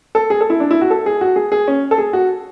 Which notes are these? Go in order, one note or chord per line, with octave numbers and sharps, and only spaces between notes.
A4
G#4
A4
E4
D4
E4
F#4
A4
G#4
F#4
G#4
G#4
C#4
A4
G#4
F#4